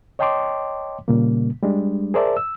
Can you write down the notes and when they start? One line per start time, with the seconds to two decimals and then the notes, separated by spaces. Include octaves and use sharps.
0.19 C#5 D#5 G5 A5 C6 D6
1.08 A#2 C#3 G3 A#3
1.62 G3 G#3 D4
2.14 G#4 A#4 C5 D5 E5 A5
2.37 E6